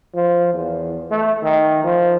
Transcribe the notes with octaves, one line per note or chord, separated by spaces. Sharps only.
F3
E2
A3
D#3
F3